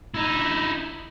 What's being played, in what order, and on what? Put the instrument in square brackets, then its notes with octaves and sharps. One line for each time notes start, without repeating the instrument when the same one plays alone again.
[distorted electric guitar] D#4 E4